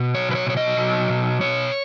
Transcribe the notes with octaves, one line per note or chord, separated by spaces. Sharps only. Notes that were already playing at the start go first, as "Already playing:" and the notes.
Already playing: B2
F#3 C#5
B4
C#5
B2 C#5
D#5
F#3
B2
B2 C#5